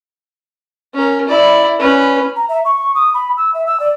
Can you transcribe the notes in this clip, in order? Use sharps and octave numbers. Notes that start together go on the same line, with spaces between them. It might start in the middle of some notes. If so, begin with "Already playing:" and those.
C#4 A#4
E4 D5
C#4 B4
A#5
E5
C#6
D#6
B5
E6
E5
E6
D5